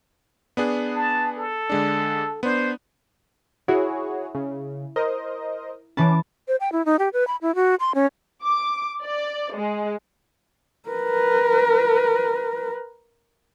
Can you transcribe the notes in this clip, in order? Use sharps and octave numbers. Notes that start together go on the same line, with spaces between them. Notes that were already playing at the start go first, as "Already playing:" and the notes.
B3 D4 G#4
A5
A4
D3 G#3 D4
B3 D4 C5
E4 F#4 G#4 C#5
C#3
A#4 C5 D#5
E3 C#4 B4 A5 D6
C5
G5
E4
D#4
G4
B4
B5
E4
F#4
C6
C#4
D6
D5
G#3
A#4 B4